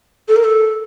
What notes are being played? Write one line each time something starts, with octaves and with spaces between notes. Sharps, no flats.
A4
A#4
A4